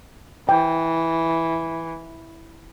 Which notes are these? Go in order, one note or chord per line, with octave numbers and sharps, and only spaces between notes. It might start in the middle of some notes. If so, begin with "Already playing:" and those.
E3 G5